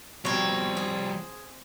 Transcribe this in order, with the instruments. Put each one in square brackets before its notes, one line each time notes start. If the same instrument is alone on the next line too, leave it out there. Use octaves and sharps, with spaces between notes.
[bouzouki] B2 A#4 [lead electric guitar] F3 G3 [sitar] C4 [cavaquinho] C#5
[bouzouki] G#4